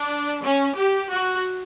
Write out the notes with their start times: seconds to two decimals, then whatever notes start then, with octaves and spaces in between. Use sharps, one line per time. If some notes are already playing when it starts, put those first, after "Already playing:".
Already playing: D4
0.43 C#4
0.76 G4
1.09 F#4